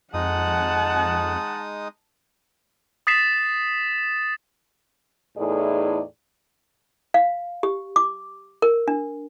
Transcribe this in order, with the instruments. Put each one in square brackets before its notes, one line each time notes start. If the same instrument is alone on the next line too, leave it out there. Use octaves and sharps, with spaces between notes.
[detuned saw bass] F2 [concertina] G#3 D#4 D#6 [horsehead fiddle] F#5 A5
[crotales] D#6 A6 B6 C7 E7
[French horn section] E2 A2 D#4 G#4 A4 D5
[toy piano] F5
G4
D6
A#4
D4